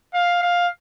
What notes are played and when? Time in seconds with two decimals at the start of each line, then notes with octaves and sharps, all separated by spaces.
0.14 F5
0.42 F5